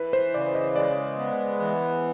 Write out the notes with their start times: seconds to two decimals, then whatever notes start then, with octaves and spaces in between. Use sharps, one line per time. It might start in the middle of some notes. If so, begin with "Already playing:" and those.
Already playing: E3 B4
0.13 C5
0.34 C#3 D5
0.55 D#5
0.76 G#3 D5
1.18 B3
1.60 E3